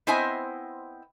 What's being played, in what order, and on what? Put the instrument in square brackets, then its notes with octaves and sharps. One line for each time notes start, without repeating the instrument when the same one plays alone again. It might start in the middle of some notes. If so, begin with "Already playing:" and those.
[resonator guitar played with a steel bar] B3 C4 E4 C5 D#5 G#5